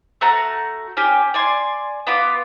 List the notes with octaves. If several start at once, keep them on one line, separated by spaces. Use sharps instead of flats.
A3 F#4 F#5 A#5
C#4 G4
D5 G#5 C6
B3 F4 B5 D6